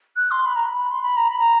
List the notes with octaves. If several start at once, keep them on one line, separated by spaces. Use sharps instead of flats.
F#6
C6
B5
A#5
B5
C6
B5
A#5
B5
A#5